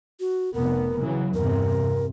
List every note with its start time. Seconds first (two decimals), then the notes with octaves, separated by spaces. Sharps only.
0.20 F#4
0.54 F1 B3 A#4
0.99 C#3 E3 F#3
1.34 E2 G2 C3 A#4